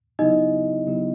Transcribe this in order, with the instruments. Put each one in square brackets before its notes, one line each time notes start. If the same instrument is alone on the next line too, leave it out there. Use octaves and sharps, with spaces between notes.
[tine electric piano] C#3 F#3 B3 E4 G4 [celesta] D#4 D#5
[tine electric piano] C#3 F#3 B3 E4 G4